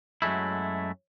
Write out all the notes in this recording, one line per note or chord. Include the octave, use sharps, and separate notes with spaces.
F#2 F#3 G#3 A3 E4